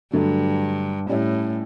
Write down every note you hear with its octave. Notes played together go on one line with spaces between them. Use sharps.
G2 D3 F#3 A3
A2 G3 C#4 E4